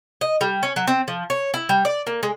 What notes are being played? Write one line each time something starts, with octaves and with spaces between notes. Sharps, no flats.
D#5
G3
C#4
F#3
C4
F3
C#5
E4
G3
D5
A#3
G#3